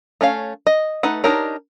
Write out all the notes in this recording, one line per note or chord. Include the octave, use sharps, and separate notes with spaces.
A3 C#4 C#5 F5
D#5
A3 D#4 B4 F#5
D4 D#4 G4 A#4 C#5